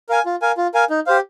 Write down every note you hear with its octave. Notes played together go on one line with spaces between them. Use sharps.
A#4 F5 G#5
F4
A#4 F5 G#5
F4
A#4 F5 G#5
D#4
G4 C5 F5